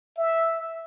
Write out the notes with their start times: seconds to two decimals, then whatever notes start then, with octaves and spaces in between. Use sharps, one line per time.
0.18 E5